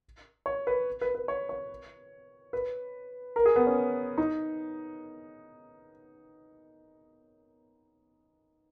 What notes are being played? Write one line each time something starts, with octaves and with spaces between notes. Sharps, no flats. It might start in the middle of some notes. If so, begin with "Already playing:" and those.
C#5
B4
B4
B4
C#5
C#5
B4
A#4
G#4
B3
C#4
D#4